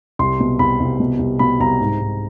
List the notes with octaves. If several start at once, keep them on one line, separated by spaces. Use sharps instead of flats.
C2 C6
B2
C2 B5
C2
B2
C2
B2 B5
C2 A#5
G#2
G#2